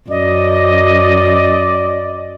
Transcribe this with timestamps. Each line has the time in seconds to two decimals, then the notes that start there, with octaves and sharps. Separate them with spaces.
0.10 F#2 D5 D#5